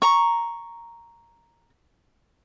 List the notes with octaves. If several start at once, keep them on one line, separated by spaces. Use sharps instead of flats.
A#5 C#6